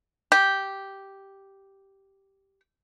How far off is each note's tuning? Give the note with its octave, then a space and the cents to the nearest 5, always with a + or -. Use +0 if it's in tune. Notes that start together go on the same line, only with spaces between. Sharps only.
G4 -5